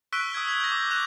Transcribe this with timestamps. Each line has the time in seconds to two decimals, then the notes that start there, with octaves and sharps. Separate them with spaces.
0.13 C#6 E6 F#6 B6 D7 G7
0.33 D#6 E6 G#6 D7
0.47 G#6 B6
0.60 G6 A#6
0.72 D6
0.90 D6 F#6 F7